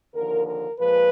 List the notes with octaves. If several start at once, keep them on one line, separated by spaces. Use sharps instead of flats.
D#2 D3 F3 A#4
A#4
A#2 F3 G#3 B4